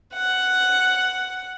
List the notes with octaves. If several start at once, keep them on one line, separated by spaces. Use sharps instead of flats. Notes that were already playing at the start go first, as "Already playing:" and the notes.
F#5